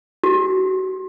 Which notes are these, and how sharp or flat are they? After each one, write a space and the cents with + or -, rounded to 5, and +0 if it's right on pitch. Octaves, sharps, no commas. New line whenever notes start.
F#4 +30